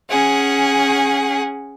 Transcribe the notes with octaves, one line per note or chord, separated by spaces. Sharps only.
C#4 G#4 F#5